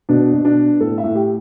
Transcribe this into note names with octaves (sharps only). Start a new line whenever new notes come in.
B2 D4
B2
D4
B3
A2 A4
E5
A2
G4